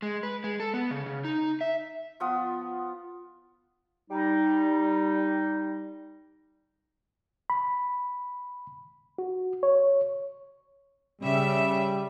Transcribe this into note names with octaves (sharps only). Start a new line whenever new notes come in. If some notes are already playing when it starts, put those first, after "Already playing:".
G#3
B4
G#3
A4
B3
C#3
C#3
D#4
E5
F3 B3 F4 D#6
G3 D#4
B5
F#4
C#5
C#3 G3 E5